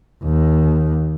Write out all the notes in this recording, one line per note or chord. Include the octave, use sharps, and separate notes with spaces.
D#2